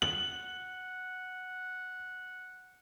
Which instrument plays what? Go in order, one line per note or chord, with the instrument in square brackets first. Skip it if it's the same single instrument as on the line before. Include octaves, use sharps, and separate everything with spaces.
[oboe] F#5 [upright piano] F#7